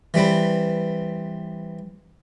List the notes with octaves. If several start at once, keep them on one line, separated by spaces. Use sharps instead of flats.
E3 G3 C4 B4